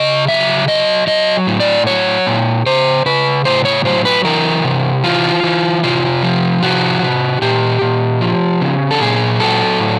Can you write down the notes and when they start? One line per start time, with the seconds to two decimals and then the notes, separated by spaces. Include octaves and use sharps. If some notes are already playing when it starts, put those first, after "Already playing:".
Already playing: C#3 D#5
0.28 F#3 E5
0.68 F#3 D#5
1.07 F#3 D#5
1.47 A2
1.60 D5
1.87 F#3 C#5
2.27 A#2
2.66 C#3 C5
3.06 C#3 B4
3.45 A2 C5
3.65 C#5
3.85 F#3 C5
4.05 B4
4.25 E3 A#4
4.64 C3
5.04 E3 F4
5.43 E3
5.83 C3 F4
6.23 F3
6.63 C3 F#4
7.02 C3
7.42 A#2 G4
7.82 A#2
8.21 F3
8.61 C#3
8.91 A4
9.00 A#2 G#4
9.40 F#3 A4
9.80 A2